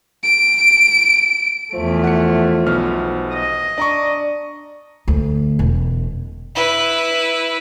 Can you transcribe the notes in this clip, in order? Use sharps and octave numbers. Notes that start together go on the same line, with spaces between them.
D7
E2 F3 A3
F#5 C#7
B1 B3 F6
D#5
D4 D5 A#5 C#6
D2
E1
E4 B4